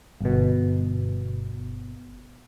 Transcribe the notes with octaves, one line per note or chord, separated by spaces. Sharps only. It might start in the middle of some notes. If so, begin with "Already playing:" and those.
G1 B2